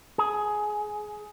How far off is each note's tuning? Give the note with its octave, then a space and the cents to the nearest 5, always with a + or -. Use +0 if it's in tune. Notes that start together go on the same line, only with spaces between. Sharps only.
G#4 +15